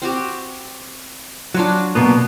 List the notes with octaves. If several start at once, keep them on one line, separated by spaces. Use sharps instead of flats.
C4 F#4 G4
F#3 D4 F4 F#4
B2 A#3 B3